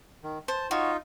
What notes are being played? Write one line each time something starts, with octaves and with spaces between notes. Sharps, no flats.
D#3
C5 A5
D#4 F4 F#4 C#5